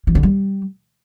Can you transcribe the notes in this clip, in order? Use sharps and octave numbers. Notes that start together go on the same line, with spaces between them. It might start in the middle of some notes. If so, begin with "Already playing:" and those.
E3
D3
G3